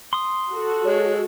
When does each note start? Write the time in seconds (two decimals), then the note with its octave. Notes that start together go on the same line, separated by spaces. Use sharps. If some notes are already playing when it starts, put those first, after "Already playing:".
0.13 C6 D#6
0.51 F#4 A4
0.85 G#3 C#5